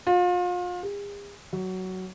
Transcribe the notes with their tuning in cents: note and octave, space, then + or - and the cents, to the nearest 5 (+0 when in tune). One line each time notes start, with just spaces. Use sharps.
F4 +35
G#4 -45
F#3 +15